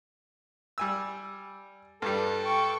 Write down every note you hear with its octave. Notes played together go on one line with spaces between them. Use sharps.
G3 G#5 E6
G2 G3 A4
G5 C#6